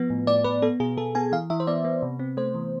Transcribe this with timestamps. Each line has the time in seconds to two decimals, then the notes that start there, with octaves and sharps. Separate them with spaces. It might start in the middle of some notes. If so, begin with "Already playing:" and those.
Already playing: F3 B3
0.10 A2
0.27 A2 D5
0.44 A2 B4
0.62 B3 A4
0.80 B2 G#4
0.97 B2 A4
1.15 B3 G#5
1.32 E3 F5
1.50 E3 E5
1.60 C5
1.67 B3 D5
1.85 B3
2.02 C3
2.19 C4
2.37 A3 C5
2.55 E3